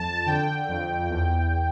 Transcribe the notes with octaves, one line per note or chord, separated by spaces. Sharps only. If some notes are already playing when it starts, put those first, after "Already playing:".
Already playing: F2 A5
D3 G5
F2
E2